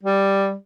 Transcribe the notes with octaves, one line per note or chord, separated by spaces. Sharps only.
G3